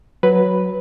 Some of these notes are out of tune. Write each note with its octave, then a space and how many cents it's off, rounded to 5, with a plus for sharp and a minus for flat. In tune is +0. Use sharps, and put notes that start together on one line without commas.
F#3 +0 B4 +0